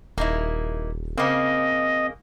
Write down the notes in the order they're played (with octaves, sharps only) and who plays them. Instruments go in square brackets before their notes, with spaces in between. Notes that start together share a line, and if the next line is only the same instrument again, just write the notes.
[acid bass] D#1 [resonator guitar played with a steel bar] A#3 D#4 E4
[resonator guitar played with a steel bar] C#3 A#3 [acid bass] C4 [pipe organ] D#5